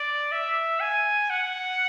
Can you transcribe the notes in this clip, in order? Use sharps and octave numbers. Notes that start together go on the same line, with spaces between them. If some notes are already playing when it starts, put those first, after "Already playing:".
Already playing: D5
E5
G#5
F#5